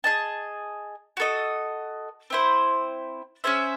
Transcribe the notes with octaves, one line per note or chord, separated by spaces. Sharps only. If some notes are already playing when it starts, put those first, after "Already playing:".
G#4 D#5 A5
F#4 A4 D#5
C4 E4 C5
C#4 G#4 C5 E5